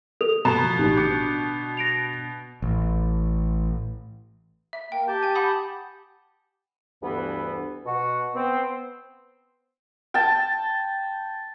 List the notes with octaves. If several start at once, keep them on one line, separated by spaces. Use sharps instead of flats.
A4 F7
B2 A#5 B5
F3
A1 D#4 G4
D3 D6 G6 C#7
A#6 D7 F7
A1
E5
A#3 G5
G4 A5 G6
G5 G#5
F#5 B5 D#6
D2 G2 E3 B3
B2 F#4
B3 C4
G5 A5